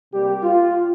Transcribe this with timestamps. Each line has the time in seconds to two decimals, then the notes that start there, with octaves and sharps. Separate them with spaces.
0.13 C3 G3 A#3 G4
0.43 F4